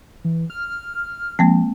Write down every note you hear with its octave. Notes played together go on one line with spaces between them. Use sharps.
E3
F6
F3 G#3 A#3 C4